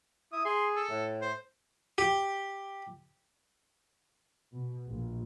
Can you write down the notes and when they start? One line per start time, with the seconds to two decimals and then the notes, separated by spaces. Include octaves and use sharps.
0.32 E4 D#6
0.45 G#4 C6
0.76 A4
0.91 A2
1.21 C5
1.98 G4
4.53 B2
4.87 A#1